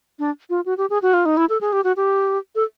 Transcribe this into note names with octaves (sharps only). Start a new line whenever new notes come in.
D4
F4
F#4
G4
G#4
F#4
F4
D#4
E4
A4
G#4
G4
F#4
G4
A4